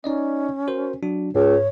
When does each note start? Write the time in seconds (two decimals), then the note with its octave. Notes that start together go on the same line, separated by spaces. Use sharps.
0.04 C#4 D#4 D5 D#5
0.68 F#4 A#4 C5
1.03 F#3 D4 F#4
1.35 C#2 G#2 C#5